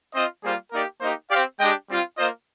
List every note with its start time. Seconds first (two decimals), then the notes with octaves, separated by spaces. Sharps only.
0.14 C4 F4 C5 D#5
0.43 G3 A#3 F4 G#4 C5
0.72 A#3 D#4 G4 A#4 D5
1.01 A#3 D#4 G4 C5 D#5
1.30 C4 G4 D5 F5
1.59 G#3 D4 G4 D#5 G5
1.88 G3 C4 F4
2.17 A#3 F4 C5 D#5